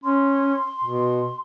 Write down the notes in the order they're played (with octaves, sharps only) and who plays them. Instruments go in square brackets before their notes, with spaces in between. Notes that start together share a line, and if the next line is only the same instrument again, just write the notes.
[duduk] C#4 [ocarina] C6
[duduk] B2